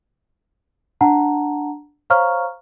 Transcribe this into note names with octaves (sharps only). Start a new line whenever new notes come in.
D4 F#5 A5 A#5
C5 C#5 F5 A#5 C#6 F6